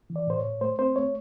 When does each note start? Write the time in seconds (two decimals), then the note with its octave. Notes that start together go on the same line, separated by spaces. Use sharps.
0.10 E3
0.16 D5
0.27 A2 C5
0.38 C#5
0.45 A2
0.61 A3 C5
0.79 C4 C5
0.96 A3 C#5